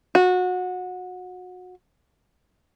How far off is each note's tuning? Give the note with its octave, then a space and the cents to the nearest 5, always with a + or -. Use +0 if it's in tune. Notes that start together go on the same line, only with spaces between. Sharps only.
F#4 -25